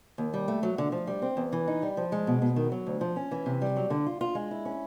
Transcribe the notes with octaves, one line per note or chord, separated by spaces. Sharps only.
D#2
G3
A3
F#3
D3
F3
G3
C4
E2
E3
D#4
G3
F3
G#3
B2
B2
D#3
F#3
D2
F3
C#4
E3
C3
G3
F#3
D3
F4
F4
G#3
E4
C#4